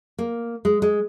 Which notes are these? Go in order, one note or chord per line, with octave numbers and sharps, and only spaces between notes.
A#3
G#3
G#3